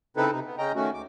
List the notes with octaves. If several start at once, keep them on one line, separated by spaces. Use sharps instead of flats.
C#3 C4 D#4 E4 A4 B4
C3 D#4
B3
C#3 C#4 D#5 G5 A#5
D#3 A3 C#4 F#4
D2 D6